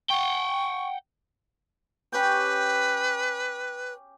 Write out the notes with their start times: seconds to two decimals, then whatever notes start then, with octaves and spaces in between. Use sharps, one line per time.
0.10 F#5 G5 C#6
2.12 C#4 G4 B4 G5